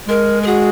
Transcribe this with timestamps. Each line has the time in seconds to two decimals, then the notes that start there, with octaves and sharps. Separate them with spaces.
0.08 G#3 A#4
0.43 A#4
0.46 F#4 G#4